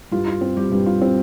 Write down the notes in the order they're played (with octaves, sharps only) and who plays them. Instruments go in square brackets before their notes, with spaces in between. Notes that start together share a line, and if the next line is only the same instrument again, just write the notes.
[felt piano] G2 F4
F4
C4
G3 G4
G2
F4
C4